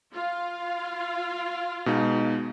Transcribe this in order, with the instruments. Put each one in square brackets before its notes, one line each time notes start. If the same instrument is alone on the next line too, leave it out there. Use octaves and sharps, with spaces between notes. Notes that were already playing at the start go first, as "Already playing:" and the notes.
[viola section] F4 F5
[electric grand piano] B2 G#3 D#4